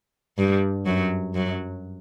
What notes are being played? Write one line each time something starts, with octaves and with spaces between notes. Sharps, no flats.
G2 G3
F#2 F#3
F#2 F#3